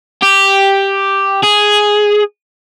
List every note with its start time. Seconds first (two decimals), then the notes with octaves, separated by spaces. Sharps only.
0.22 G4
1.43 G#4